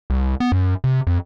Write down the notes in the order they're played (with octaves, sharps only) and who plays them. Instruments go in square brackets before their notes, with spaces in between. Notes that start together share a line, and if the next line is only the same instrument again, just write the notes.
[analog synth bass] C2
B3
F#2
C3
F2